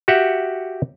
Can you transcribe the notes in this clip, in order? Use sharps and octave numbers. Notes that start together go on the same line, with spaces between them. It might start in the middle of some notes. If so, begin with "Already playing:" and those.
F#4 G4 E5 F#5 G5